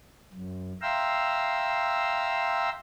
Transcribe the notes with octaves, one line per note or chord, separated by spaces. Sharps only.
F#2
E5 F5 G5 A#5 C6 E6